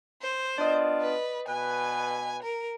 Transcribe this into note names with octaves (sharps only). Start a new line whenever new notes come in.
C5
B3 D4 F4 D5 D#5
B4
B2 B4 G#5
A#4